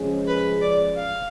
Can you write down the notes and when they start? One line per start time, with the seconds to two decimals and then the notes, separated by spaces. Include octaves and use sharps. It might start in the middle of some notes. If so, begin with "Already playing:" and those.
Already playing: C#3 F3 G#3 C#4 G#4
0.27 B4
0.62 D5
0.96 F5